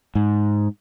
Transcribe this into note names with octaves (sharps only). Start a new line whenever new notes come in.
G#2